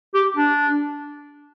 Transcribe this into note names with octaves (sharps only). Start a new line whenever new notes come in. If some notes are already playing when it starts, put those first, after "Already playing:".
G4
D4